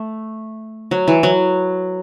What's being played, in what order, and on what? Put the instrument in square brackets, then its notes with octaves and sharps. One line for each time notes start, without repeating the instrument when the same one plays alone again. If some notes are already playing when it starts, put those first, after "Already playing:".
Already playing: [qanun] A3
F#3
E3
F#3